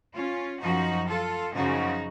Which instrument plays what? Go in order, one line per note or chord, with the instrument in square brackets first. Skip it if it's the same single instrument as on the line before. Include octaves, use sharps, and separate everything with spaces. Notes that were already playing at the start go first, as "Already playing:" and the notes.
[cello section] C#4 F4
F#2 F3 D#4 F#4
F4 A4
F#2 C#3 F3 D#4 F#4